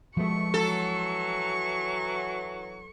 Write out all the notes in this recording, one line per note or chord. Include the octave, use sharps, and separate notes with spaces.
B2 F3 G#3 A3 C#6
E3 F#3 A4